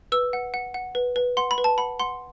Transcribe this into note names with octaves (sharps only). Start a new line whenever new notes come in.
B4 E6
F#5
F#5
F#5
B4
B4
F#5 C6
B5
B4
A5
F#5 B5
F#5 C6